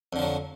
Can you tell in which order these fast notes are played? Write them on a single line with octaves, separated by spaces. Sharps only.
F2 D3 F3 F#3